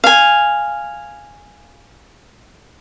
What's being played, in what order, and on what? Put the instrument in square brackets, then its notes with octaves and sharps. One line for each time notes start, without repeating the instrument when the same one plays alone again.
[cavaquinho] F5 G#5